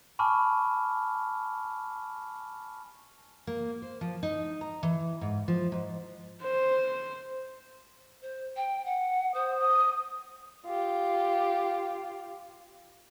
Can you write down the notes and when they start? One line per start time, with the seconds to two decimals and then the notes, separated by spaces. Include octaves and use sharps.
0.19 G#5 A5 B5 C#6 D6 F6
3.47 A#3
3.82 C5
4.01 F3
4.23 D#4
4.61 A#5
4.83 E3
5.21 G#2
5.48 F3
5.72 G#2
6.43 C5
8.22 C5
8.56 G5
8.85 F#5
9.34 C5 D#6
9.59 D#6
10.66 F4 G4